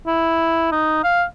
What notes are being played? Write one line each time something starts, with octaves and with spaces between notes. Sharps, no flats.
E4
D#4
F5